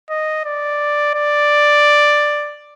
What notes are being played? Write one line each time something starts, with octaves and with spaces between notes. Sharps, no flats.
D#5
D5
D5